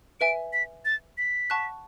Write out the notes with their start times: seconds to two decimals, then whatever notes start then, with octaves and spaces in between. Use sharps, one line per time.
0.20 B4 E5 G#5 D7
0.53 B6
0.85 A6
1.18 B6
1.50 F#5 A5 C#6 F#6